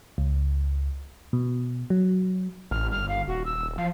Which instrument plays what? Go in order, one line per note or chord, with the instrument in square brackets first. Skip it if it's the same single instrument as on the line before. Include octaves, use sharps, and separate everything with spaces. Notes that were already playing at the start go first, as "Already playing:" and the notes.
[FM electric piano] C#2
B2
F#3
[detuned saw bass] A1 [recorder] F6
[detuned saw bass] G1 [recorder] F6
[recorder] F5
[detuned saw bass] D#1 [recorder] F#4
[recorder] E6
[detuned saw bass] F3 [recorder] F5